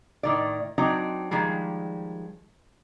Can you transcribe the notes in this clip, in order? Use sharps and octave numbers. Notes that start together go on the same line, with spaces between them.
A2 D#3 D5
F#3 C4 D4 D#4 D5
D#3 F3 G3 G#3